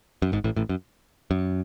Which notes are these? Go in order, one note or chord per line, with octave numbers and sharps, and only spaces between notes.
F#2
G#1 G#2
A1 A2
A1 A2
F#2
F#2